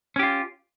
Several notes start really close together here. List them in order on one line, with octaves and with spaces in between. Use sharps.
C#4 G4 F4